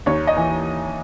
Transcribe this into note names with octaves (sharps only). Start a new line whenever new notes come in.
D#2 C#5
D#5
E3